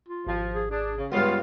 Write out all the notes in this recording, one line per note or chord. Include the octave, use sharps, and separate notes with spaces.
F4
G#1 F3
G#4
D4 G#4
C#3
C#2 G2 B3 F4 C#5